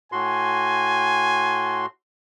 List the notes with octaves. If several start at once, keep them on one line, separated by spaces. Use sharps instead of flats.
A2 F#4 G#5 C6